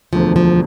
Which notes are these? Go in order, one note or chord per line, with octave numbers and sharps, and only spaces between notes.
E1 D2 D3 F3
F3